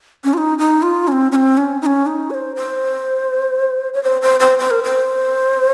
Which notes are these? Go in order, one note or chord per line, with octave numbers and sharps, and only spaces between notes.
C#4
F4
D#4
D#4
F4
C#4
C4
C#4
C4
C#4
D#4
C#4
D#4
C#5
C5
C5
C#5
C5
C5
C5
C5
A#4
C5